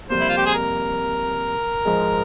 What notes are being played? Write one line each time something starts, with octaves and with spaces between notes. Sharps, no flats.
F2 C3 G3 A#3 C5
E4
F4
G4
G#4
A#4
G#2 F3 G#3